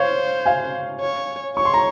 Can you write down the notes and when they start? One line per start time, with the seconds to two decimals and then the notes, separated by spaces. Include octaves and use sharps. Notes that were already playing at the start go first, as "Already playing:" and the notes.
Already playing: C5 C#5 F5
0.46 F5 G#5
1.01 C#5
1.57 C#5 C#6
1.65 C6
1.74 A#5